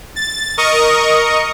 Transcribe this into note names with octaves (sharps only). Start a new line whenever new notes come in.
A6
A#4 D#5 C#6 D#6